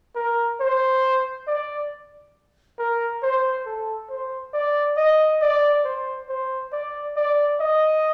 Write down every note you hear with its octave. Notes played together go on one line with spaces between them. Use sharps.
A#4
C5
D5
A#4
C5
A4
C5
D5
D#5
D5
C5
C5
D5
D5
D#5